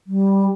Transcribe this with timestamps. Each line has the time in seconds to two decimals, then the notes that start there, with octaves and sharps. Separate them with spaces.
0.07 G3